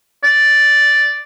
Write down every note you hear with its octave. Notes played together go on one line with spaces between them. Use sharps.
D5